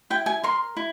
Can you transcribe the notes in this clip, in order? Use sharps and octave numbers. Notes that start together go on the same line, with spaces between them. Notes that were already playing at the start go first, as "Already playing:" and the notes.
E4 G5
G#5
A#4 C6
E4